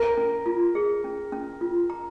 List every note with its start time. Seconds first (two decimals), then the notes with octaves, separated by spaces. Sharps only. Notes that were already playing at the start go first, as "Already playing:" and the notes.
Already playing: A#4
0.17 C#4
0.46 F4
0.75 G#4
1.04 C#4
1.32 C#4
1.61 F4
1.90 A#5